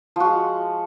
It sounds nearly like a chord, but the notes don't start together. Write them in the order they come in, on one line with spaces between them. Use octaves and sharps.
F3 F#4 G#3